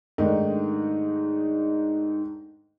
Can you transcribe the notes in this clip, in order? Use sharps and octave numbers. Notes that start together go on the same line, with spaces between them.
G#2 D#3 A3 D4 D#4